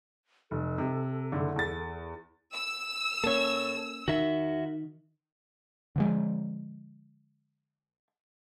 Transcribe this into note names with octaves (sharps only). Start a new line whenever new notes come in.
F1 A4
C3
F#1 D3
E2 A6
E6
A#3 C#4 A4 C#5
D#3 F#4 E5
D3 F3 G#3